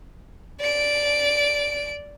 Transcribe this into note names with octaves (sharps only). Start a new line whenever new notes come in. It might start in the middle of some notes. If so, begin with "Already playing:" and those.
D5 D7